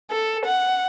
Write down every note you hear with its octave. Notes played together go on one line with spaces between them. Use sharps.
A4
F#5